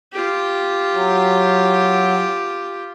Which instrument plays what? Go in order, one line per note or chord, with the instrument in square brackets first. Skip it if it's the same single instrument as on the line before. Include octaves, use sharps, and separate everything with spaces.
[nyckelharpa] F4 G4
[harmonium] F#3